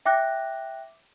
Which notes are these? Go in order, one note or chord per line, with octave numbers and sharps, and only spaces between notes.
E5 G5 D6 F#6 A#6